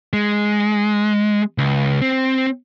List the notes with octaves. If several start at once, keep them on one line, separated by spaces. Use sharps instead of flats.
G#3
C#2
C4